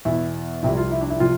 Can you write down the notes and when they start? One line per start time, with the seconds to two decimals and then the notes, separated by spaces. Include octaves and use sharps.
0.05 E2 B2 E4
0.63 C2 C3 F3 E4
0.77 F4
0.92 E4
1.01 D4
1.10 E4
1.20 C3 F3 F4